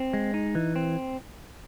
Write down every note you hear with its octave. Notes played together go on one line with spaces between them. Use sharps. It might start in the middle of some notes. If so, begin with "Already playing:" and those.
Already playing: C4
G#3
D#4
E3
C4